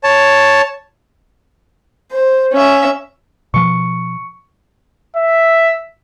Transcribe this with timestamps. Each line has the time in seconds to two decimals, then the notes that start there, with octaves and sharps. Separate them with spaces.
0.04 C#5 A5
2.12 C5
2.54 C#4 E5
3.54 B2 F3 C#6 C#7
5.17 E5